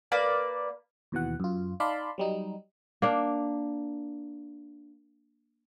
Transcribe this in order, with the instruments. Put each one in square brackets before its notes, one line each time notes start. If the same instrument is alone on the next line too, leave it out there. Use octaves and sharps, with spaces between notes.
[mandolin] A#3 B4 D5
[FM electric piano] D#2 B2 E3 F#5
F#2 F4
D#4 D5 F5 A5 B5 C6
F#3 G3 D#4
[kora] A#3 D4